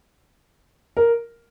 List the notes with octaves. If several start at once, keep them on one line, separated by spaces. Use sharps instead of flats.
A#4